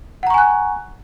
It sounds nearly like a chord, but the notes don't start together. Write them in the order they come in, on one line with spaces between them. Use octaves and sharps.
F#5 A#5 C#6 G#5 F#6